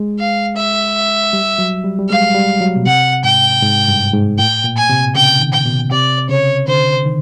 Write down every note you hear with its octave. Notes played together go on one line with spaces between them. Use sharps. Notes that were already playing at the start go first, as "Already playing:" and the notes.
Already playing: G#3
F5
E5
G3
F#3
G3
G3
G#3 F5
G3
F#3
B2
C3 F#5
G#2 G5
G#2
G2
G#2
A2 G5
A#2
G#5
C3
C#3 G5
D#3
G5
B2
C3 D5
C#3 C#5
D3 C5
D#3